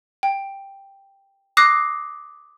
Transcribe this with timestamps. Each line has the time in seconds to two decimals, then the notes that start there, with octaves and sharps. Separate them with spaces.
0.23 G5
1.57 D6 D#6 F#6 A#6 C7